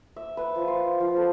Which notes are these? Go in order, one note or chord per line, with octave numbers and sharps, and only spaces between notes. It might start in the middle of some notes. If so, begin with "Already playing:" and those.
E5
B4
F3
C5
F3
A4